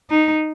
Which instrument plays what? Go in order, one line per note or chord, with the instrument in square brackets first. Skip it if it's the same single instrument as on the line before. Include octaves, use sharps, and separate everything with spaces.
[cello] D#4